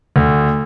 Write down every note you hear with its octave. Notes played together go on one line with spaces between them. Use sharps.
D2